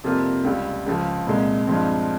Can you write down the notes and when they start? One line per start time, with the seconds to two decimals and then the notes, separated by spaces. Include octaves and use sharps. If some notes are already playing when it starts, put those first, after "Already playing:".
0.04 F2 C3 G3 A#3 F4
0.44 C#2 C#3 G3
0.86 C#2 C#3 F3
1.27 C2 A#2 G#3
1.67 G2 F3 G#3 C4